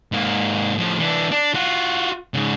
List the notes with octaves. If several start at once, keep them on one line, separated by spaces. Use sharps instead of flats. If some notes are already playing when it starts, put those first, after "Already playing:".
G#2 A#3
A2 F3
E3 D4
D4
F4 F#4
G#2 C#3